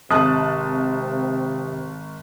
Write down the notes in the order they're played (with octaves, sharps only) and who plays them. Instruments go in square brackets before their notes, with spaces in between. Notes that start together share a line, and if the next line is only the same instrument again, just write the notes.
[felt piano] G#1 A5 F#6 [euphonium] C3 [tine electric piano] D#6